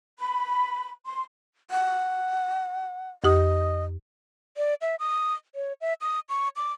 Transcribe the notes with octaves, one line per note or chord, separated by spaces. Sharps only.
B5
C6
F#5
F2 G4 D#5 D#6
D5
E5
D#6
C#5
E5
D#6
C#6
D6